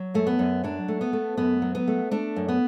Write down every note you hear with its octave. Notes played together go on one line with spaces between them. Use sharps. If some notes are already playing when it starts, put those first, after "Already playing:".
Already playing: F#3
F#2 A3
B3
F#2
F#3 D4
A3
B3
A3
F#2 B3
F#3
B3
A3
A3 D4
F#2
B3